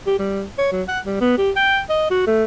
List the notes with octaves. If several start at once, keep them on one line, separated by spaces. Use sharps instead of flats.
G4
G3
C#5
F#3
F#5
G3
B3
G4
G5
D#5
F#4
A3